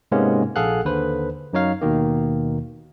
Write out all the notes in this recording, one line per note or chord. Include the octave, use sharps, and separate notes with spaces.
G#2 C3 G#3 A#3 B3 C#4
A#1 G#4 A4 F5 F#5 F#6
D#2 D3 B4 C5
F#2 F#3 D#4 C#5 F5
D#2 B2 D#3 A#3